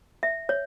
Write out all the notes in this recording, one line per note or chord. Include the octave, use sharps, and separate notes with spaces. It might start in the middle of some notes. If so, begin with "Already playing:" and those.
E5
C#5